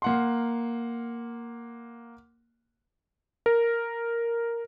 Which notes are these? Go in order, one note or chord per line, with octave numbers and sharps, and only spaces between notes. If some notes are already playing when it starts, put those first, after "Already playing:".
A#3 F#5 C6
A#4